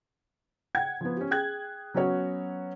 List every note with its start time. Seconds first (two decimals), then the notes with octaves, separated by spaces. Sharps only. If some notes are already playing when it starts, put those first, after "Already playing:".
0.75 F#5 G5 G#6
1.01 F3 B3
1.16 C#4 G4
1.31 G#4 G5 F#6 G#6
1.94 F#3 B3 C#4 F#4 C#5